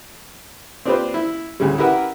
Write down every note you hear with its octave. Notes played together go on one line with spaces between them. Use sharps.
C4 D4 F4 G4 B4 C5
E4
D2 A2 C#3 G3
E4 G4 A#4 B4 E5 F#5